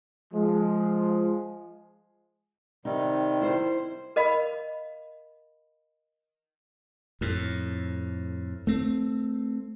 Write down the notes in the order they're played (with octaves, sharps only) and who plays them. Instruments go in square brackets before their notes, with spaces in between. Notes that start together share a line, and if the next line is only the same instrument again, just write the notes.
[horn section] F3 G#3
[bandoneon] C3 D#3 G3 [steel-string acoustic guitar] D#4
[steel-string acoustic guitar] E4 C5
[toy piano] A#4 D#5 F5 B5
[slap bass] F2 A2
A3 C4